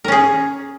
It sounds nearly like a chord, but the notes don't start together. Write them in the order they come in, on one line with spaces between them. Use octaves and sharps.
A#4 C#4 G#4